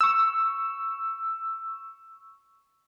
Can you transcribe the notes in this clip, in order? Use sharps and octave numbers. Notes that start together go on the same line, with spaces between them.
C#6 E6